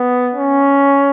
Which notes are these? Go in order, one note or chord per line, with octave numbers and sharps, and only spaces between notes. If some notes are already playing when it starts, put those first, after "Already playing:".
Already playing: B3
C#4